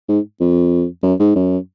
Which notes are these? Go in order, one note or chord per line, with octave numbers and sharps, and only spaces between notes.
G#2
F2
F#2
G#2
F#2